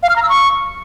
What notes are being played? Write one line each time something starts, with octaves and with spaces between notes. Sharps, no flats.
F5
F6
A#5
E6
C#6